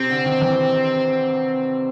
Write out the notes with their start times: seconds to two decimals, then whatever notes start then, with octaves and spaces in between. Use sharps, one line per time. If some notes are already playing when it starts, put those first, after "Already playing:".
Already playing: C3 C4
0.10 D3
0.26 D#3
0.41 E3